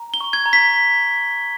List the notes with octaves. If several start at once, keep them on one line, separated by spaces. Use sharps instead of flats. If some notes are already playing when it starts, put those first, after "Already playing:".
Already playing: A#5
G7
C#6
G#6
A#5
B6